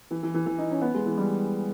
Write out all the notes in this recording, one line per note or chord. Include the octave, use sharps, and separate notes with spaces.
E3
E3
E3
E3
D#4
C#4
B3
G#3
E3
G3